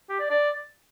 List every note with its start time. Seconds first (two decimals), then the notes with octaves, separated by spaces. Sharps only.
0.09 G4
0.20 D5
0.30 D5